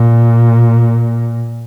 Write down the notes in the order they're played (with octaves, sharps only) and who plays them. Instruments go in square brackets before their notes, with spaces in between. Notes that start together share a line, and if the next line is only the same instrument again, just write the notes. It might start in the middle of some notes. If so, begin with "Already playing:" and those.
Already playing: [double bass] A#2